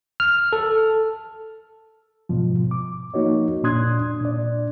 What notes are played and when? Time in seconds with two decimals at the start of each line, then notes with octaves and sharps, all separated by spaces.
0.20 F6
0.53 A4
2.29 G#2 B2 F3
2.71 D6
3.14 F3 A#3 D#4 F#4 C#5 D#5
3.64 A#2 D4 C6 D#6 F#6 G#6
4.21 A#2 D4 D5